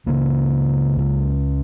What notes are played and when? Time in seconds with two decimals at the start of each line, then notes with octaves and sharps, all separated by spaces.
0.06 C#2 C#3 A#3
0.96 C#2 C#3